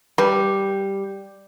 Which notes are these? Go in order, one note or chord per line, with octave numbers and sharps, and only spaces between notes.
G3 B4